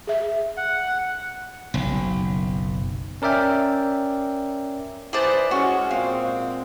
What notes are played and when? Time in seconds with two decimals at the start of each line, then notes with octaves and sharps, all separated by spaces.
0.07 G#4 E5
0.57 F#5
1.74 F#1 B1
3.22 C#4 A#4 D5 E5 G5
5.13 E4 G#4 B4 C5 D5 A5
5.51 G#3 C#4 F#4
5.91 A#2 G#3 C4 F4